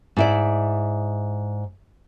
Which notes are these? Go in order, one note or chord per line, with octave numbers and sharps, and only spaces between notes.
G#2 E4 D5